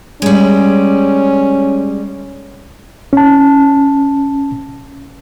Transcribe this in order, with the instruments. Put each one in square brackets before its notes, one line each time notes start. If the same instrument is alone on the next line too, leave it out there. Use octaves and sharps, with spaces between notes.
[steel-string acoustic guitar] G3 G#3 [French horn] C#4
[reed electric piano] C#4 A5